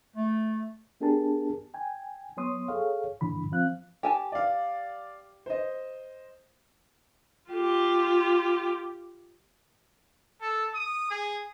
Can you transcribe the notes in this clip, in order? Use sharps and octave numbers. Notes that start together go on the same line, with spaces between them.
A3
B3 D4 G4 G#4 A#4 A5
G5 G#5
F#3 B3 C#5 C6 D#6
G#4 A4 C#5 F5
G2 A#2 D3 E3 B5
F3 C4 F5 F#6
G4 G#5 A5
D5 F5
C5 D#5
F4 G4
A4
D#6
G#4